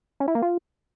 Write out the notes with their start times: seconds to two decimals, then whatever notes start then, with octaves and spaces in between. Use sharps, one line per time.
0.20 C#4
0.28 E4
0.35 A#3
0.42 F4